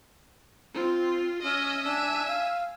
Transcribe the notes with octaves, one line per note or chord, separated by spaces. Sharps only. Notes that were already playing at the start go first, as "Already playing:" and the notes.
C4 F4
C#4 D#5 E5
D4 E5 G#5
F5